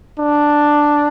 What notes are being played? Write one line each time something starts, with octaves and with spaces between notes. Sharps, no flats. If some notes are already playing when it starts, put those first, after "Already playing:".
D4